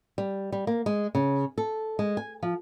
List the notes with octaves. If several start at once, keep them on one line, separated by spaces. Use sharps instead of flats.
G3
G3
A#3
G#3
C#3
A4
G#3
G#5
F3